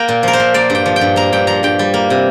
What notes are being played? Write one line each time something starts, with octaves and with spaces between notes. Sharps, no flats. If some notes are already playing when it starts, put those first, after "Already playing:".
Already playing: A#3 G5 A#5
A#2
F3 A#4
C5
A#2
A#3 D5
G2 G5
F3
G5
G2
A#3 A#5
G2 G5
F3 A#5
G2 G5
G3
A#3
C3